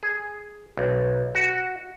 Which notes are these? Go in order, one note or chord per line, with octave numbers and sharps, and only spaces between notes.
G#4
B1
F#4